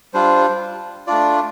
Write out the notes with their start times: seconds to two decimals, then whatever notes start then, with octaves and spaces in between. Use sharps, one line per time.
0.14 G3 D4 F4 C5
1.07 A3 D4 F4 D5